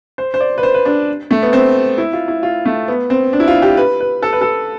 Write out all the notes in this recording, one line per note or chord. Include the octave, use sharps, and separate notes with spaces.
C5
C5
D5
B4
C5
B4
D4
A3
B3
C4
E4
F4
E4
F4
A3
B3
C4
D4
E4
F4
G4
B4
B4
A4
B4
A4